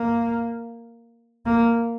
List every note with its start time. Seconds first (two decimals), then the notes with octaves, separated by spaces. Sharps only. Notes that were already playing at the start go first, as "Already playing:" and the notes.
Already playing: A#3
1.46 A#3